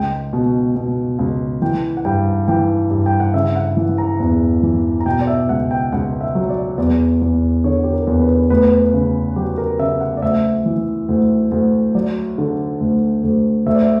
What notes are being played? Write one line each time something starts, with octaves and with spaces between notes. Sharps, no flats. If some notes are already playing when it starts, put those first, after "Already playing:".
Already playing: C#2 G5
B2
B2
C#2
E3 G5
F#5
G2 G5
E3 G5
G2
G5
F#5
C#3 E5
F#5
E3
A#5
E2
E3
A#5
B2 G5
D5
E5
C#2 F#5
G5
C#2 F#5
E5
F#3
D5
E2 D5
E2
D3 C#5
G4
A#4
E2
B4
D2 B4
C#3
F#3 G4
A#4
C#3 E5
F#5
D5
D2 E5
E3
D2
D2
F#3 D5
D3
D2
D2
D2 E5
D5
E5